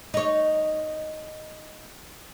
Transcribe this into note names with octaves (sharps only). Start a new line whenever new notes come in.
D#4 C#5